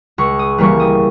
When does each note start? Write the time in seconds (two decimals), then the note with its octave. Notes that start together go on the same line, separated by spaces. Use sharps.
0.18 C#2 C#6
0.39 D#6
0.58 C#3 E3 G3 A#3 C#6
0.80 D#6